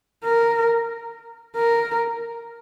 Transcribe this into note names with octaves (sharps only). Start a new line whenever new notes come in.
A#4
A#4